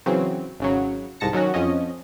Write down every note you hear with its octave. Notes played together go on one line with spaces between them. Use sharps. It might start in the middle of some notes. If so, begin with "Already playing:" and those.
C#3 E3 F#3 C4
G#1 C#3 F#3
C2 G#2 A5 A#6 C#7
D#3 F#3 C#4 F#4
F2 F3 C#4 D#5